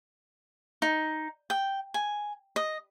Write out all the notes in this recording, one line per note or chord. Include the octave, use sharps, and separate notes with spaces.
D#4
G5
G#5
D#5